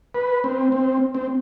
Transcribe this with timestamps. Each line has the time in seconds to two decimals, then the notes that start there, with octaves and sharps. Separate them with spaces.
0.15 B4
0.44 C4
0.72 C4
1.15 C4